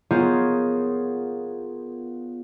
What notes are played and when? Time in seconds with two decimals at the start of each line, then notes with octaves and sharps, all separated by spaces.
0.11 B3 F4 G#4 A#4 C5 C#5